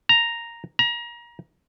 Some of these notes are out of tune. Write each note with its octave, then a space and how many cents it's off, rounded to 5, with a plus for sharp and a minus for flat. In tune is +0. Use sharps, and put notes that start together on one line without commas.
A#5 +0
A#5 +30